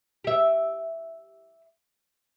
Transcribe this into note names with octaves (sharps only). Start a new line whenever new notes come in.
G4 E5